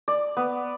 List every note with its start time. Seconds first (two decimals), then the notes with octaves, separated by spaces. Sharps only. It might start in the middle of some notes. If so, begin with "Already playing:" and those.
0.08 D5
0.37 B3